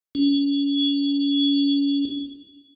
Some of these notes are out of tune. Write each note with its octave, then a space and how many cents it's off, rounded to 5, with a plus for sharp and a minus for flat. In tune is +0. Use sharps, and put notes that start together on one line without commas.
C#4 +30